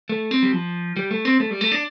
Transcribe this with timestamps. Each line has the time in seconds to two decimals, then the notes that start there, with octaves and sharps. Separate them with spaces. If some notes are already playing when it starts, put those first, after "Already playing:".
0.09 A3
0.31 C4
0.43 G3
0.53 F3
0.96 G3
1.11 A3
1.25 C4
1.40 A3
1.51 G3
1.61 A3
1.72 D4